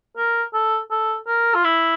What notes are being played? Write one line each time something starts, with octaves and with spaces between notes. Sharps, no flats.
A#4
A4
A4
A#4
F4
E4